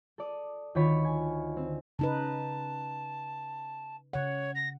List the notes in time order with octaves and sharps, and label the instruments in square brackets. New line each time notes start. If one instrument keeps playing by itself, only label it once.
[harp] A4 D5 D#6
D2 D3 D#3 F4 C#5 B5
G#5
C4
[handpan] C#3 D#4 B4 [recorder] A5
[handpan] C#3 F#5 [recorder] C#5
[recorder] A#6